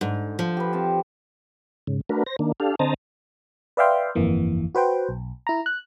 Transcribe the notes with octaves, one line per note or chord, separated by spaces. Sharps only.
G#2 D3
F3 A5
G4 B4
C4 F5 A5
G#2 C#3
A3 D4 F#4 A#4 B4
C5 A#6
D#3 A#3 D4
D4 G4 A4 F5
D3 C4 C5 D#5 A5 A#5
B4 D5 E5 F5 G5 C6
G1 F2 E3 A#3
F#4 B4 C5 G5
B1
E4 A#5
F#6